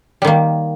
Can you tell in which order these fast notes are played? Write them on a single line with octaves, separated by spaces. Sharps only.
G3 D#3 A#3